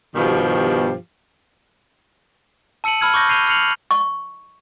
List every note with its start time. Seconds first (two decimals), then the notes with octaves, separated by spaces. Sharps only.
0.16 G2 B2 D#3 F3 G4
2.84 A5 E6 C#7 D#7 F#7
3.01 A5 B5 E6 F6 G#6 F#7
3.14 C#6 D6 F#6 G6 A#6
3.28 G6 C7 D#7 F7 G7
3.47 F6 C7 C#7 F7 F#7
3.91 C#6